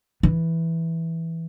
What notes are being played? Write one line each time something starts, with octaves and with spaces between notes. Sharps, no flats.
E3